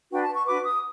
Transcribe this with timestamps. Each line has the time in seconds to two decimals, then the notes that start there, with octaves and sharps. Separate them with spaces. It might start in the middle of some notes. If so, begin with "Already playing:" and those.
0.11 D4 F#4 B4 G5
0.22 A5
0.34 C#6
0.45 D4 F#4 B4 D6
0.62 D#6